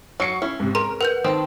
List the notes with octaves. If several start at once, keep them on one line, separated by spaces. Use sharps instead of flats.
F#3 C#6 C7 C#7
C#4 E4
G#2 C3
G#4 A#4 C6
A#4 B4 F#5 G6
D#3 C4 A5